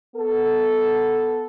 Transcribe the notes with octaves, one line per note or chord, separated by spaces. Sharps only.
B3 A4